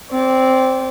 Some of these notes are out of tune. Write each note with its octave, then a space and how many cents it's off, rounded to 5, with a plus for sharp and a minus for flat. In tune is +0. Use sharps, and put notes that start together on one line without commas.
C4 +0 D5 -30